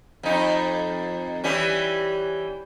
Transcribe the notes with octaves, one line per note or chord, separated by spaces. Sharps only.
F2 D#4
E3 G3 C#4